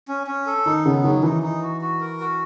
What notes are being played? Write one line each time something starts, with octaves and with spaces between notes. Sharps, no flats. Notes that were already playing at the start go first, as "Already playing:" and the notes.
C#4
C#4
A4
D#3 D#4
C#3 B3
D#3 F#3
E3 D#4
D#4
F#4
F#4
A#4
F#4